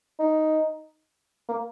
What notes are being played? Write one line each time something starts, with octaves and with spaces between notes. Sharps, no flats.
D#4
A#3